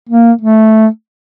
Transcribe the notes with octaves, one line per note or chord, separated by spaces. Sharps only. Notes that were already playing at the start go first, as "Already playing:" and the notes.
A#3
A3